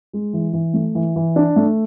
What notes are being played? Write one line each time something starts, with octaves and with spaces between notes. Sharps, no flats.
G#3
E3
E3
A3
E3
E3
D4
A3